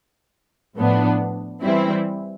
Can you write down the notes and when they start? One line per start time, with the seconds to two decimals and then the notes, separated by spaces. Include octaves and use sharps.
0.76 A2 F3 B3 D4
1.61 E3 G3 C4 E4